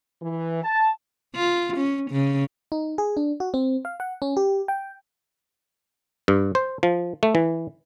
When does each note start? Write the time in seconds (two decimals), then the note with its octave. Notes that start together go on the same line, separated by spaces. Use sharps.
0.22 E3
0.64 A5
1.36 F4
1.77 C#4
2.11 C#3
2.72 D#4
2.98 G#4
3.17 D4
3.40 F#4
3.54 C4
3.85 F5
4.00 F#5
4.22 C#4
4.37 G4
4.68 G5
6.28 G2
6.55 C5
6.83 F3
7.23 A3
7.35 E3